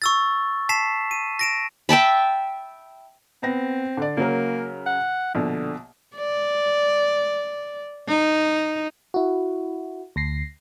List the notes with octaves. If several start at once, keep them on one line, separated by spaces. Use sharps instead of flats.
C#6 E6 A6
A5 B6 C7 E7
D#7
A#6 D7 E7
E5 G5 A5 B5
B3 C4 A#6
D3 D5
C#3 F#3 A#3 A#4
F#5
A#1 B2 D3
D5
D#4
E4 F#4
D2 A#6 C7